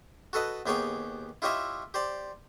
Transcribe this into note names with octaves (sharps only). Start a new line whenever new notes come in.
F#4 A4 B4 D#5
D#2 B3 G4 G#4 C#5 G5
E4 F4 G4 C#5 D#5 E5
G4 C5 D5